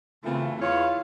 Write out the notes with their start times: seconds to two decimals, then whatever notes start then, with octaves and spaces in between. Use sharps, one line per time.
0.25 F#2 C#3 E3 A3 C4 F4
0.61 E2 E4 F4 C#5 F5